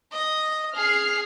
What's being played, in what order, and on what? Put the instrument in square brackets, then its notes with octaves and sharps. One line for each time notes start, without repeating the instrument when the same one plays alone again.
[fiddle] D#5
[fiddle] G#4 [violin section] F6 C7